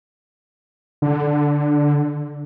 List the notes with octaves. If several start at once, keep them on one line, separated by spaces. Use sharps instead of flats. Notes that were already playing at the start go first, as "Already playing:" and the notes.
D3